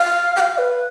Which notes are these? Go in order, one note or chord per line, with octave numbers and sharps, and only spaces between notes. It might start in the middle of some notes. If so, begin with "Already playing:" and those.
Already playing: F5
G5
F5
B4